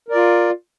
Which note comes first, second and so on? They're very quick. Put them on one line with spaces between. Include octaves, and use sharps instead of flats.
A#4 D5 F4